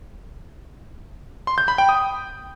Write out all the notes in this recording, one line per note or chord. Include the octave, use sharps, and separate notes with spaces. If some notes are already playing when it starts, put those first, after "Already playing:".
C6
G6
B5
G5
D#6